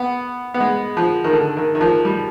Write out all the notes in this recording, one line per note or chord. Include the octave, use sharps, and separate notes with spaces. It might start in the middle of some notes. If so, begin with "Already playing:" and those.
Already playing: B3
B3
G#3
F3
D#3
D3
D#3
D#3
F3
G3